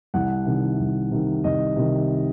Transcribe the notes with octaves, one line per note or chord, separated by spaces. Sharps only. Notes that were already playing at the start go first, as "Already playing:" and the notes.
C2 F#5
C3 D#3
C2
C3 D#3
C2 D#5
C3 D#3